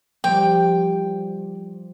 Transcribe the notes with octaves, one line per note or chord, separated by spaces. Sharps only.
F3 G3 G5